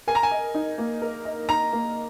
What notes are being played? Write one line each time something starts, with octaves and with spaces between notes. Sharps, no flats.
A#4 G#5
A#5
G#5
D#5
D#4
A#3
A#4
D#5
D#4 A#5
A#3